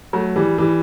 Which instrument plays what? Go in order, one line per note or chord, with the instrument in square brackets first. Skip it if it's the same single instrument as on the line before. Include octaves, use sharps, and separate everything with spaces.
[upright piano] F#3 A3
E3 G3
E3 G3